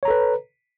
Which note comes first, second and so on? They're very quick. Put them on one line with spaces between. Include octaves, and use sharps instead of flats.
C#5 A#5 A4 B4